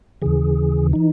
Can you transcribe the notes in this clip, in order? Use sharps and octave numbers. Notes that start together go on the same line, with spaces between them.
D#2 C#3 E3 G#4
E3 D#4